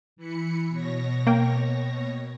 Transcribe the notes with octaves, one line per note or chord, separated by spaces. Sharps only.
E3 B5 C#7
B2 C#5 A#6
A#3 G5